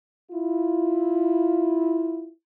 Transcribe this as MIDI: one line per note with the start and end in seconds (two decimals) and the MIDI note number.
0.32 2.29 64
0.32 2.29 65